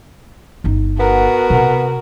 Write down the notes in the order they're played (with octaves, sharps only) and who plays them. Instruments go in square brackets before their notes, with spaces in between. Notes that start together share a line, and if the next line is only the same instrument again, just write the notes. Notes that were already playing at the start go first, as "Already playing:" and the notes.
[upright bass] G1 D#4
[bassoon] B3 [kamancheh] F#4 A#4
[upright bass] C3